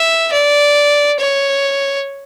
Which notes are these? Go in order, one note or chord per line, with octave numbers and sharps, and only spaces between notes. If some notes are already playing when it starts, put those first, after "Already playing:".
Already playing: E5
D5
C#5